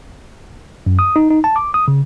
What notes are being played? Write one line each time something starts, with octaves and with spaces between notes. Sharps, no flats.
F#2
D#6
D#4
D#4
A5
D6
D#6
C#3